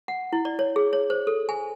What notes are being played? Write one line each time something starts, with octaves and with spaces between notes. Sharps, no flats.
F#5
E4
D5
C#5
G#4
C#5
C5
A4
G#5